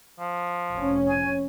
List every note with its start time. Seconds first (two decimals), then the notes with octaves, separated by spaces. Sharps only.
0.19 F3
0.73 F1 C#4
1.08 G#5